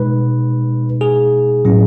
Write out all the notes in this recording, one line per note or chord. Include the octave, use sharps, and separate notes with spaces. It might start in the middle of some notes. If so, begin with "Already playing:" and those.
Already playing: B2 G#3 D#4 B4
G#4
A2 F#3 C#4 E4